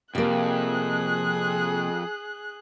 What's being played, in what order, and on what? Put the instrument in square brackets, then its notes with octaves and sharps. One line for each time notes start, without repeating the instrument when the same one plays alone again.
[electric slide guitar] F2 [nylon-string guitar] C3 A#3 [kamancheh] G#4 F#6